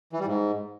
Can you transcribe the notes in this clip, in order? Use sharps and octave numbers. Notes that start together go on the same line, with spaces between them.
E3
G3
G#2